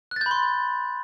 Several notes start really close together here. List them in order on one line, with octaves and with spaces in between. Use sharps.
F#6 A6 G6 B5 C6